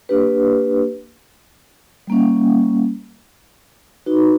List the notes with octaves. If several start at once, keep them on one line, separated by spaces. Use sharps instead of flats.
A#3 D4 G4 B4
G3 A#3 C#4
D#4 F#4 B4